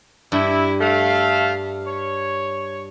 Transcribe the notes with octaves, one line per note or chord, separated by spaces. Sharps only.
G2 E4
A3 F5
C#5